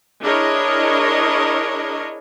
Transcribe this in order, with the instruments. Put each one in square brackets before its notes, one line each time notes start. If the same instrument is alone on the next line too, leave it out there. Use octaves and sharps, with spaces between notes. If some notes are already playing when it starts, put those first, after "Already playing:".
[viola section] D4 E4 G#4 A#4 C#5 D#5